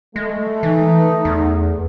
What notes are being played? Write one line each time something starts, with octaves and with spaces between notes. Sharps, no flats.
G#3 A3
E3 D#4
E2